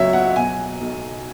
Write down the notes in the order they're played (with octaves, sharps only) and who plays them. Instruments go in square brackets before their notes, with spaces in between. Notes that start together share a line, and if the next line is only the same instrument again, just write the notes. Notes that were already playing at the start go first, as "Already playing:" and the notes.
Already playing: [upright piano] C#2 F#3 C#5 E5
F#5
B2 G#5
B1